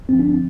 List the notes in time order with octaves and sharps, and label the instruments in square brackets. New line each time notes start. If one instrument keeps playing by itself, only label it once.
[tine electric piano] G2 D3 F3 C4
D4
C4